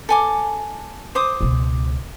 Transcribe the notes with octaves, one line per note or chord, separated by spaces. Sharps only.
A4 G#5 D6
C5 D6 D#6
C#2 B2